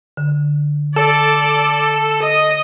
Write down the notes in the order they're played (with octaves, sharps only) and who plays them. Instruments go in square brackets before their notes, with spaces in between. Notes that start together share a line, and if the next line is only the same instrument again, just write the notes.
[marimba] D3
[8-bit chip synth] A4 [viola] D5
[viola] D#5